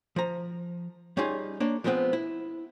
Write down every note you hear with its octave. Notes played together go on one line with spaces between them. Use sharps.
F3 A#5
G3 C#4 D#4 F4 G#4
A#3 D4 C#5
F3 G#3 B3 C4 F4
E4